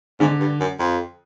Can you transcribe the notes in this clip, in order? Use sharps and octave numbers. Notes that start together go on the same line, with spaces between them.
G#2 D3
G2
F#2
F2